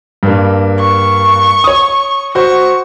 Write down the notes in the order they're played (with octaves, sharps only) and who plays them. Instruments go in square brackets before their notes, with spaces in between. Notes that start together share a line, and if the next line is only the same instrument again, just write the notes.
[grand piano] G2 A#3
[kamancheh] C#6
[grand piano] C#5 D#6
[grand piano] F#4 C5 [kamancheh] C#6